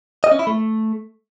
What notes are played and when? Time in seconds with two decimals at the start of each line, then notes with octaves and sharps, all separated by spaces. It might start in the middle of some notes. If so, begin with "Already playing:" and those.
0.24 D#5
0.32 C#4
0.39 E4
0.47 A3